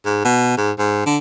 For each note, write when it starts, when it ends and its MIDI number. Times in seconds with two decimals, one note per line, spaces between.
0.05 0.22 44
0.25 0.56 47
0.58 0.71 44
0.79 1.02 44
1.06 1.18 50